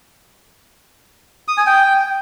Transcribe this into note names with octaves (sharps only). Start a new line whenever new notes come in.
D#6
G#5
G5